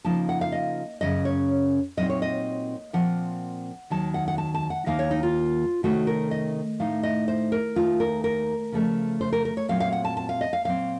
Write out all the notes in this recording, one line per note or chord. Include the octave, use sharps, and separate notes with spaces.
C#3 F3 A#3 D#4 A5
F#5
F5
D#5
F#2 C#3 F#3 A#3 C#4 D#5
C#5
A#2 F#3 C4 D#4 D#5
C#5
D#5
A#2 F3 C4 F#5
D#2 D#3 F#3 A5
F#5
F#5
A5
A5
F#5
D#2 D#3 A#3 D#4 F5
C#5
D#4
F4
C3 D#3 A3 C#4 F#4
A#4
D#5
A2 A3 D#4 F5
D#5
C5
A#4
D#2 D#3 A3 F4
A#4
A#4
C#3 F3 A3
C5
A#4
A#4
C#5
A#2 F#3 C4 F5
F5
F#5
A5
A5
F5
D#5
F5
A#2 F#3 C4 F5